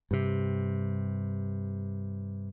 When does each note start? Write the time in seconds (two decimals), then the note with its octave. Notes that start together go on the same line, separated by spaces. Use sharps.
0.11 G2 C3